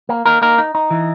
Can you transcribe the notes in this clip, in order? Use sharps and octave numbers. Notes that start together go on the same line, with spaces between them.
A#3
A#3 D#4 A#4
A#3 D#4 A#4
D#4
D#4
E3